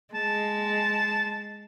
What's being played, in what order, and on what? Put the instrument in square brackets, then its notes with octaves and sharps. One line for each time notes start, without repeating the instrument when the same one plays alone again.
[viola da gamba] G#3 [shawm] A5